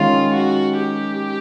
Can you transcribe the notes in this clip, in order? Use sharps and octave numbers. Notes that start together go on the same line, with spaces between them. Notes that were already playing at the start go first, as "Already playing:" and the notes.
Already playing: D#3 G#3 C#4 F4
F#4
G4